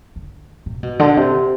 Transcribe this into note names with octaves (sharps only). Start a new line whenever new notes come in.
D3
C3
B2
D3
C3